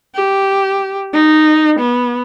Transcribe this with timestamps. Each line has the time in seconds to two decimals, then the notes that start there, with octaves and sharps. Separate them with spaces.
0.15 G4
1.13 D#4
1.79 B3